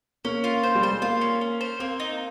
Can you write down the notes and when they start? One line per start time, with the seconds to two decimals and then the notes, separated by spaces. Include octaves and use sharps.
0.25 A#3 C#4
0.44 F4
0.63 C5
0.75 G3
0.83 C5
0.89 G#3
1.02 A#3 F4
1.21 C#4
1.41 C#4
1.61 C5
1.80 A#3 C4
2.00 D#4